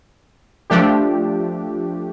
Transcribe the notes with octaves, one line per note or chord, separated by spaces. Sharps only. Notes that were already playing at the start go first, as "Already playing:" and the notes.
F3 A3 D4 G4